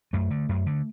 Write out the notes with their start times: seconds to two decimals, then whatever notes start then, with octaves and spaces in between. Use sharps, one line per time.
0.13 F#2 A3
0.31 D3
0.49 F#2
0.66 D3